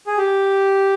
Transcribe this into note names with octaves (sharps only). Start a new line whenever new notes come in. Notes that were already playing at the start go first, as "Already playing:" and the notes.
G#4
G4